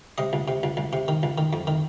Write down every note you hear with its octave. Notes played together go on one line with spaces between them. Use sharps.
C3 D#5
C#2
C3
C#2
C#2
C3
D#3
C#2
D#3
F2
D#3